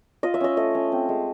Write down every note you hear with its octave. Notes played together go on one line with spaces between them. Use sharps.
F4 D#5
E5
C#4 D#5
A3 D#5
C#4
C4
G#3